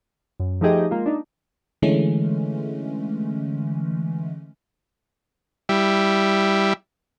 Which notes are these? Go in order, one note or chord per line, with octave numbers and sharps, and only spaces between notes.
F#2
F3 A3 D#4 G4 G#4 D#5
G#3 A#3 F4
D4 D#4
D3 E3 G#3 A3 C#4
G3 E4